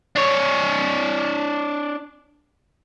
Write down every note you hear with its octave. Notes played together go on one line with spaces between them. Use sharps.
D4 C#5